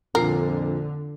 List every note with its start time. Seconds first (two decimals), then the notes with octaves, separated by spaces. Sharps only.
0.15 F2 A#2 D3 A#4 C7